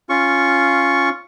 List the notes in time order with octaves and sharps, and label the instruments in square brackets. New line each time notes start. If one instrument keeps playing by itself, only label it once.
[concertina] C#4 F4 C#6